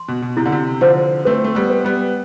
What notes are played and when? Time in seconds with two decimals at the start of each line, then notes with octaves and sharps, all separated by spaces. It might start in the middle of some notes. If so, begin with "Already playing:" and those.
Already playing: C6
0.08 B2
0.22 B2
0.37 C3 E4
0.46 D3
0.52 C3
0.81 D3 F3 C5
1.25 A3 C4 B4
1.44 A3
1.55 G3 B3
1.70 B4
1.84 G3 B3